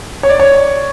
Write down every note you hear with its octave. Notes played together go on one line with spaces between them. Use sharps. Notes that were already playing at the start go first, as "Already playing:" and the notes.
C#5
D5
C#5